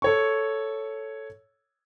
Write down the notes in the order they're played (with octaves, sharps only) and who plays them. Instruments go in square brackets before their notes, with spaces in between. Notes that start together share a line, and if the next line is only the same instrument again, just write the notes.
[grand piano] A4 C#5 C#6